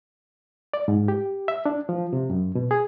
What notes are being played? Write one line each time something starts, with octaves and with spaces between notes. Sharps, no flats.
D5
G#2
G4
E5
D4
F3
C3
F#2
B2
G#4